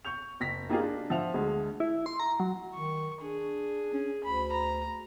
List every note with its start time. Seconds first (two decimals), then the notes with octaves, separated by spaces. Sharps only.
0.05 C#6 G6 F7
0.40 F#1 A#6 B6
0.69 A#3 D#4 F4 G4 G#4
0.81 D4
1.10 F3 E5 F#5 F7
1.34 D2 D3 G#3
1.80 E4
2.06 C6
2.20 A#5
2.40 F#3
2.74 D#3 C#6
3.22 D4 G#4
3.93 C#4
4.24 D2 B5
4.52 A#5